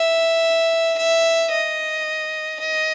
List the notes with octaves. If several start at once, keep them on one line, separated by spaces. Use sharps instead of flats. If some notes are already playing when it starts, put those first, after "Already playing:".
Already playing: E5
E5
D#5
D#5